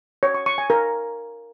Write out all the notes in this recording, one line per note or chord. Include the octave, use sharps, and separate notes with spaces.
C#5
C#6
C#6
G#5
A#4